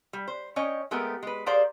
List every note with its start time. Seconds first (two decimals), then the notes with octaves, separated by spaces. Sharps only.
0.13 G3
0.28 C5
0.56 C#4 C#5 D#5 G5
0.91 G#3 A3 B3 G4 A#4
1.23 G#3 B4
1.46 G4 G#4 A#4 C5 D5 F5